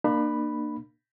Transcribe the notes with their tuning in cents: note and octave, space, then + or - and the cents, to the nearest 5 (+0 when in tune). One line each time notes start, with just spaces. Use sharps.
A#3 +0 D4 +40 B5 +0